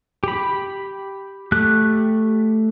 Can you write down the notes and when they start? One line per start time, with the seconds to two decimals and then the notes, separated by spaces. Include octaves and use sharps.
0.24 G4 B5
1.52 A3 G4 F#6